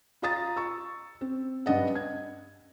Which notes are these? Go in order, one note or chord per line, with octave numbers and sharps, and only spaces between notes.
F4 F5 A#5 D#6 A6
C#6 E6
C4
G2 G3 D4 D#5 F#5
G#6